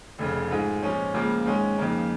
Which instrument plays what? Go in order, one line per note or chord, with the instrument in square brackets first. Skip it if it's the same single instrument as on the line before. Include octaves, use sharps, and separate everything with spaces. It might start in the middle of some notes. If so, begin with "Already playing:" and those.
[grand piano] F1 F2 C#3
G#2 G#3 F4
A#2 F3 G#3 C#4
C#2 C#3 F3 A#3
G#2 D#3 G#3 C#4
F2 C#3 A#3 D#4